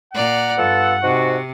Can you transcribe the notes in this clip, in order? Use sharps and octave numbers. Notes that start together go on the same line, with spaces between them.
A#2 D5 F#5 A#5
G2 B3 F4 A4
G#2 C3 F#4